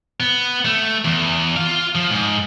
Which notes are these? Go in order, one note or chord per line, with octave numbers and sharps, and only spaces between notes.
B3
A3
E2
F4 F5
F3
G#2